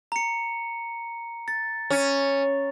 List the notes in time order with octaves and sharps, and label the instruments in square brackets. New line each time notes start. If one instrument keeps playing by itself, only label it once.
[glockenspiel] A#5 C#7
A6
[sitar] C#4